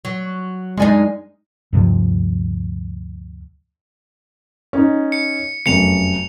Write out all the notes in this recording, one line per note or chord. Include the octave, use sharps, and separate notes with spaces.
F#3
F#2 G#3 D4 D#4 G#5
D2 G2 C3 F3
C#4 D#4
C#7
F1 F#2 C#7 F7